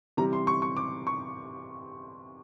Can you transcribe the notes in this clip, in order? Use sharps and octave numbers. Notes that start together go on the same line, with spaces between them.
C3 E3 G3 A#5
C6
C#6
C#6
D6
C#6